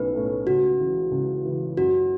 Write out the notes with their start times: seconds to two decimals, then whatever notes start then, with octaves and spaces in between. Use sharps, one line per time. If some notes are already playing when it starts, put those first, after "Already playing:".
Already playing: B1 A2 A3 C#4 B4
0.14 A2 A3 C#4
0.47 C#2 F#4
0.80 C#3 E3
1.11 C#2
1.45 C#3 E3
1.77 F#2 F#4